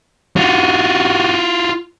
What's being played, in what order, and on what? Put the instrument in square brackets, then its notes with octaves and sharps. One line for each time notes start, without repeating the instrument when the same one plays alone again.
[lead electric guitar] F4 F#4